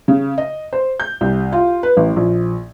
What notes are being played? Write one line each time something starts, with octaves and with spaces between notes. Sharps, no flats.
C#3
D#5
C5
G6
C2
F4
B4
A1
A#1